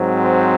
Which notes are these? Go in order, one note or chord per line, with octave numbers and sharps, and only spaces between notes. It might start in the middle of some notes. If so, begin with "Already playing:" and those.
Already playing: G#2 F#3 C4
C5